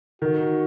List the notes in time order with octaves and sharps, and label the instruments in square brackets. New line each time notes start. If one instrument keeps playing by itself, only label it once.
[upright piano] D#3 [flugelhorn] F#4